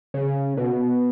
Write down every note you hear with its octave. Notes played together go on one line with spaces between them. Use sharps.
C#3
B2